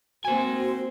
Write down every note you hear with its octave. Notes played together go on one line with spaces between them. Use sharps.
A#3 C4 F#4 C5 G#5